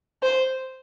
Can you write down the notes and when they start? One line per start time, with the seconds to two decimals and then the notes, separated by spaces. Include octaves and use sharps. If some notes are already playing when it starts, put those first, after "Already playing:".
0.23 C5